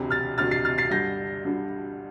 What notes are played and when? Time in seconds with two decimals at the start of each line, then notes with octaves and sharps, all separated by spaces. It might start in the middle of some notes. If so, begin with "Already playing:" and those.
Already playing: E1 D2 C3
0.10 F6 A6
0.37 E1 D2 C3 F6 A6
0.51 A6 C7
0.65 F6 A6
0.78 A6 C7
0.91 G2 D3 G3 G6 A#6
1.45 G2 D3 G3